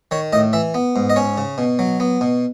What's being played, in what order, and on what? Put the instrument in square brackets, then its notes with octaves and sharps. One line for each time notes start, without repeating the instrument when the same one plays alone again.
[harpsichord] D#3 C#5
A2 D#5
E3 E5
B3
G#2
D#5
C#4 C#5
C#3
B2
F#3
B3
B2